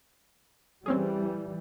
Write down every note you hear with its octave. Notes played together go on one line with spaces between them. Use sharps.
E3 G3 C4 C#4 G#4